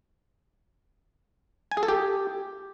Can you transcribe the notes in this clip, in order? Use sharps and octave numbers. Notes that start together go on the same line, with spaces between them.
G#5
G#4
A4
G4